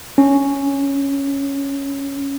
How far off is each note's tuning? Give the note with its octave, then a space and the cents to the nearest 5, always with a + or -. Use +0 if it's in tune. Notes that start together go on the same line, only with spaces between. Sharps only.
C#4 +0